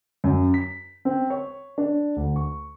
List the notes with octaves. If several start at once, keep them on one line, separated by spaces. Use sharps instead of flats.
F#2
B6
C4
C#5
D4
D2
C#6